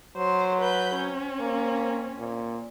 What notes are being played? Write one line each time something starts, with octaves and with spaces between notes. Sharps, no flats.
F#3 C5
B4 B5 G6
C4 C#4
A#3
A#2